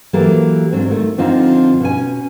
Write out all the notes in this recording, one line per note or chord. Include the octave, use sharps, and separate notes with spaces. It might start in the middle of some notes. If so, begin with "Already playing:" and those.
E3 F#3 A#3 G4 A4
G#2 F#3 C4 D4
D#3 A3
F2 D3 F3 C4 D#4 F4
B2 C#4 G#5